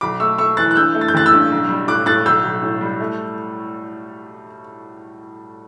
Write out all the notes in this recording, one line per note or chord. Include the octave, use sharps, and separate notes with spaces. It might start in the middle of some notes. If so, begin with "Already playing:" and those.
B1 B5 D6
A3 C#6 E6
A3 C#6 E6
E3 F#6 A6
F#6
G2 E6 G6
A3
A6
G6
A1 F#6 A6
E6 G6
G2
B1
G3
A2 D6 F#6
A2 F#6 A6
B1 E6 G6
B1
A2
G3
A3